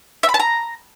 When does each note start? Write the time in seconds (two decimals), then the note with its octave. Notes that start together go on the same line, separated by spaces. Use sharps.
0.23 E5
0.29 B5
0.34 A5
0.40 A#5